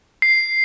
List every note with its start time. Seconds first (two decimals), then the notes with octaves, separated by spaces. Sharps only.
0.22 C7